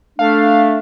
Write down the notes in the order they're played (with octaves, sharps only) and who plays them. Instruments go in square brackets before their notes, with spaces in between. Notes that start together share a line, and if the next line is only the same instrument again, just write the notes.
[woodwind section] A3 D4 [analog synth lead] F5